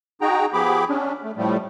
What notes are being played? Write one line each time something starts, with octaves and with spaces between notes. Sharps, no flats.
D#4 F#4 G#4 G5 A#5
F3 B3 G4 G#4 B5 D6
C#4 D4
A3
A2 F3 G3 A3